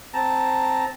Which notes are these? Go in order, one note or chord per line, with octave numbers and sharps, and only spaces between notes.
C4 A5 A#5